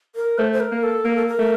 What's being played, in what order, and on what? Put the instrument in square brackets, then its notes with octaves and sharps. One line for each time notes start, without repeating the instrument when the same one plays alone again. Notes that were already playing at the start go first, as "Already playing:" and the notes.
[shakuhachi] A#4
[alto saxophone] A3 [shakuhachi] C5
[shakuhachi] C5
A#4
[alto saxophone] A#3
[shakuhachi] A4
[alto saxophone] A#3 [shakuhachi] A#4
[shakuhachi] A4
A#4
[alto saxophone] A3